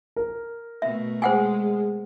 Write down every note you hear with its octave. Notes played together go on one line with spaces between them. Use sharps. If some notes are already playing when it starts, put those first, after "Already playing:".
A#4
B2 A3 E5
G#3 C5 F#5 G#5